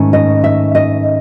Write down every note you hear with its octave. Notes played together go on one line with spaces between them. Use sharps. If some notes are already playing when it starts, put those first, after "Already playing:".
Already playing: G#2 D#3 A3 C#4
D#5
E5
D#5